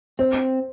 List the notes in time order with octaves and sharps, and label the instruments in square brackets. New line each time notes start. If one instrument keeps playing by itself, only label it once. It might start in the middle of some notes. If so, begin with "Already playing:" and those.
[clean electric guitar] C4 [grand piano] C5